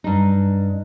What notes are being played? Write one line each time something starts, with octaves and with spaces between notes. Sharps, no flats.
G2 D#4